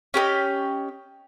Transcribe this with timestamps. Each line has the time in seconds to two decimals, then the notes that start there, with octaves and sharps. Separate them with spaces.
0.14 C#4 G4 A#4 D#5